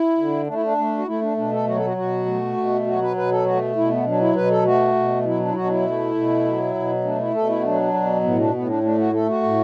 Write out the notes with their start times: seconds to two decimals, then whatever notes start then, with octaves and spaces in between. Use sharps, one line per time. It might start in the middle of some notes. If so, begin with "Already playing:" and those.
Already playing: E4
0.18 D3
0.47 A3 D4
0.54 E4
0.62 D4
0.77 A3
0.98 F#4
1.07 A3 E4
1.22 D4
1.37 B2 D4
1.52 A4
1.67 F#3 F#4
1.76 A4
1.86 F#4
1.97 B2 F#4
2.26 A3
2.57 B2
2.86 F#3 F#4
3.02 B4
3.16 B2 B4
3.31 A4
3.46 A3 F#4
3.76 B2 E4
3.90 B3
4.06 F#3 D4
4.21 E4
4.35 B2 B4
4.50 A4
4.65 A3 F#4
4.95 B2
5.25 F#3 E4
5.40 D4
5.48 E4
5.55 B2 F#4
5.64 D4
5.70 E4
5.85 A3
6.15 B2
6.45 F#3
6.74 B2
7.04 A3 D4
7.19 E4
7.34 B2 A4
7.49 E4
7.59 B3
7.64 F#3 D4
7.94 B2
8.24 A2 B3
8.39 D4
8.54 A2 B3
8.68 D4
8.83 A3 D4
8.98 F#4
9.13 A3 A4
9.29 F#4
9.43 A2